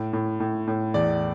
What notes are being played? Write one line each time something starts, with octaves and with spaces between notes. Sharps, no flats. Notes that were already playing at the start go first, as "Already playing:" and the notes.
Already playing: A2
A2
A2
A2
E2 D5